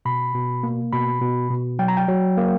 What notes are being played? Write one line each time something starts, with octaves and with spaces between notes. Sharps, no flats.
B2 B5
B2
A#3
B2 B5
B2
B2
F#3 G5
A#5
G5
F#3
A#3